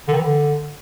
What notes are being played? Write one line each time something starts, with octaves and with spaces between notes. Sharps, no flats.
D3
D#3
E3
D3